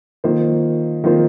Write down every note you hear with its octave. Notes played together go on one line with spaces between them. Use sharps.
D#3 A#3 F4 C5
D#3 A#3 F4 C5